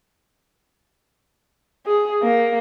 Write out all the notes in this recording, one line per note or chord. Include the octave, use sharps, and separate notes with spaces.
G#4
A#3